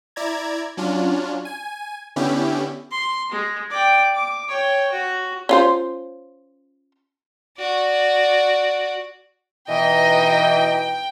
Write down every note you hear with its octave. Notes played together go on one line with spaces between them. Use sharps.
E4 D5 A#5 G#6
F#3 C#4 D4 F4
G#5
D3 B3 C#4 E4 G4
C6
G#3
D5 G5
D6
C#5 G5
F#4
C#4 F4 C5
F#4 D5
B2 E3 D#4 D#5 G5